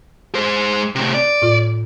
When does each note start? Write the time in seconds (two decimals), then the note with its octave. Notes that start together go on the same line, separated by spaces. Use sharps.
0.35 G#3 C5
0.95 A2 C3
1.14 D5
1.42 A2 F4